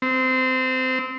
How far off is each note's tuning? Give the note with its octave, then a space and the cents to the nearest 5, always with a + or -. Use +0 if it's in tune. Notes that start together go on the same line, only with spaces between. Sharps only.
C4 -20